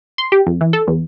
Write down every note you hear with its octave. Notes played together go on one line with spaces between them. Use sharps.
C6
G4
F2
E3
A4
E2